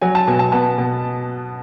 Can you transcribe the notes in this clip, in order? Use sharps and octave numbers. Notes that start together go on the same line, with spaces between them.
F#3 G#5
A5
B2 G#5
A5
B3 A5
B2